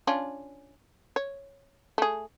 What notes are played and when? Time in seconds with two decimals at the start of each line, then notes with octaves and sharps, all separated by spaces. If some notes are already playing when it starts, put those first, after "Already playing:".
0.07 C#4 D4 F4
1.16 C#5
1.98 A3 G#4